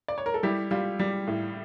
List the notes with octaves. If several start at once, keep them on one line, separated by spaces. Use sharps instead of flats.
D5
C#5
A#4
A4
G3 E4 G4
G3 F4
G3
A2